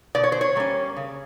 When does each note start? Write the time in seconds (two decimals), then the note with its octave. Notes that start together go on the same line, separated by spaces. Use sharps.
0.15 B2 D5
0.24 C#5
0.32 C5
0.41 C#5
0.56 G3 A#3 C#4
0.96 C#3